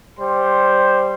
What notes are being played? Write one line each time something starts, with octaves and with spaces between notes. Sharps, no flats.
G3 C5 C6